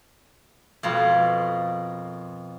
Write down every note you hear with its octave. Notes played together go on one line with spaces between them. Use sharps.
F2 B2 A#3 F4